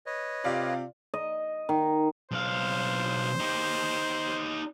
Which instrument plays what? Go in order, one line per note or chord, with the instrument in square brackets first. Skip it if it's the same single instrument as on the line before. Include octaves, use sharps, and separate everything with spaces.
[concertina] B4 C#5 D#5
[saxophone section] C3 F4 [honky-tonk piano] D5 F5
[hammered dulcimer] D#5
D#3
[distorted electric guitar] B1 F5 [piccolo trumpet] C5
[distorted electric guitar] D#4 G4